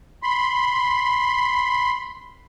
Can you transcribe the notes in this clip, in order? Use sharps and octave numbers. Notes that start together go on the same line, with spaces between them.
B5 C6